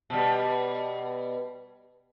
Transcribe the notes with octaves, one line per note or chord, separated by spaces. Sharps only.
B2 G3